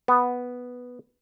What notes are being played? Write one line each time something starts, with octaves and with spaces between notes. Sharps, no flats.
B3